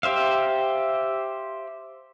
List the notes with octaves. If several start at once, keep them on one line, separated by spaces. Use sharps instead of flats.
G4 C5 E5 F5